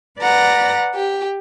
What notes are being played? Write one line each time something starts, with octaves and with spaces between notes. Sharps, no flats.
B4 D5 F#5 A#5 A#6
G4